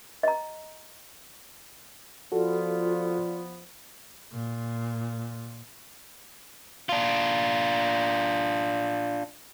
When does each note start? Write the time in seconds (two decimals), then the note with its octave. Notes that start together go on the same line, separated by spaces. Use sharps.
0.23 D#5 A#5
2.32 F3 B3 F4 F#4 A4 D5
4.32 A#2
6.89 D4 F4